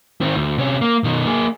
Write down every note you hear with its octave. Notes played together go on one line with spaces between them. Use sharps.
D#3 C4
D2
C3 C#4
A#3
B2 D#3
A#3 G#4